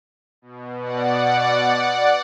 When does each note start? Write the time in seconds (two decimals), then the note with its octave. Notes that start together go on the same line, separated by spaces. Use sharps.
0.42 B2
0.82 D5 F#5